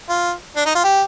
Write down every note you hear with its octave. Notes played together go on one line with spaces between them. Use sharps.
F4
D4
D#4
F4
G4